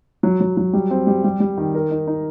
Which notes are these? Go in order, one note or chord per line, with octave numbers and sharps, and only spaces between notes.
F#3
F#3
F#3
G3
C4
G3
G3
G3
D#3
A#4
D#4
D#4